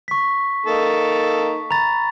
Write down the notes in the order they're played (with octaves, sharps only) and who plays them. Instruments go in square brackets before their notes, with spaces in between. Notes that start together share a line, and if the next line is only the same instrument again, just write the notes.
[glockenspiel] C#6 B6
[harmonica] A#3 D#4 A4
[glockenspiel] A#5 B5 A6